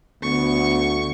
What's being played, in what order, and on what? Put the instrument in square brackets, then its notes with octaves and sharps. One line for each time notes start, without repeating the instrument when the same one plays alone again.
[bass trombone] D2 [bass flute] B3 [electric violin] C#6